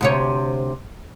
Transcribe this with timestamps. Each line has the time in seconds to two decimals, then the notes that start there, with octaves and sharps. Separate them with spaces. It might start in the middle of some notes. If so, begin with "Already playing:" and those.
0.01 D2 C3 C#5